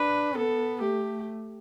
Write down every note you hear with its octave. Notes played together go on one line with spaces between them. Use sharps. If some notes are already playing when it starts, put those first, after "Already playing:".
Already playing: D4 B4
B3 A4
A3 G4